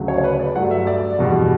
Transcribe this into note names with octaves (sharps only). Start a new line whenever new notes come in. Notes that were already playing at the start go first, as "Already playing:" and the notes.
Already playing: D2 C#3 F#3
C#5
C#5
B4
D5
G2 F#3 A3 F#5
E5
D5
E2 B2 G3